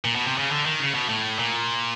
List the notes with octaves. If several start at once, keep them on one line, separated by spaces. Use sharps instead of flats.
A#2
B2
C3
C#3
D3
D#3
C#3
B2
A2
A#2